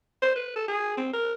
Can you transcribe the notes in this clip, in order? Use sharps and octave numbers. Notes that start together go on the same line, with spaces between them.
C5
B4
A4
G#4
C4
A#4